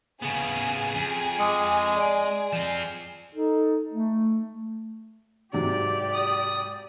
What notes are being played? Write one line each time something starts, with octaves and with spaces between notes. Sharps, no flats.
C#3 B3 G#4
F2
G#3 D6 D#6 C#7
D5 G#5 D7
F3 C4
D#4 A4
A3
G#2 C3 F#3 G4 D5
D#6